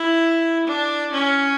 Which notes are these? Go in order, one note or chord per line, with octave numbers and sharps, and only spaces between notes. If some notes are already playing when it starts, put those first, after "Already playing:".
Already playing: E4
D4
C#4